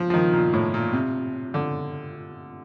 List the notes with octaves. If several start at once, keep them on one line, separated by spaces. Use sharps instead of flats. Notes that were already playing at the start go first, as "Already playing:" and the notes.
Already playing: F3
F3
D#3
A#2
A2
A#2
C3
D3